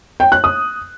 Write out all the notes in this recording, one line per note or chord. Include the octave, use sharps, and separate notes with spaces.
G5
F#6
D#6